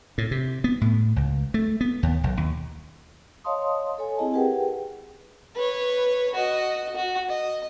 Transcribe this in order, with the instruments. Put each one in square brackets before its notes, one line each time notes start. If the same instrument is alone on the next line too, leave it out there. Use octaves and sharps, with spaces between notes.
[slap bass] A2
C3
B3
A2
C#2
A3
B3
D#2
B1
D#2
[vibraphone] C#5 D#5 F5 A5 C6 D#6
A4 C#5 G#5
C4 E4 G#4 D#5 G#5 A5
G4 G#4 A#4 B4 F#5 G5
[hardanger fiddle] B4 C#5
F#4 D#5
F#4
D#5